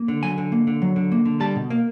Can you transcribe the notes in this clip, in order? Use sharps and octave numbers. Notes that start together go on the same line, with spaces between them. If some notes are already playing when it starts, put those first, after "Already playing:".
Already playing: A#3
D3
F#3 G#5
D3
A#3
D3
F#3
D3
A#3
D3
G3 A5
B2
A#3